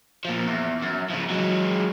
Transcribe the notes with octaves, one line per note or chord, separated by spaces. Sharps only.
A#2 F3
E2
F#2
C#3 F3
F#3 G#3